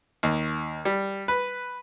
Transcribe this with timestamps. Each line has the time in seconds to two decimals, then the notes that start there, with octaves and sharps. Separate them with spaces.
0.23 D#2
0.85 G3
1.28 B4